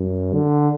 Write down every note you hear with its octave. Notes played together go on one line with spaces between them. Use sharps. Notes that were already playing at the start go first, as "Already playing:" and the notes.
Already playing: F#2
D3